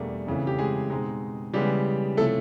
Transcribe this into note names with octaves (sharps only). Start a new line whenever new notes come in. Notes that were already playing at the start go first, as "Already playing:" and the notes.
Already playing: E2 B2 G3 A3 A#3 D4
F2 C#3 E3 A3
G4
G#3 G#4
B2 G#3 C4 D#4
C#3 E3 G3 G#3 B3 G4
C3 F3 A3 C#4 E4 A4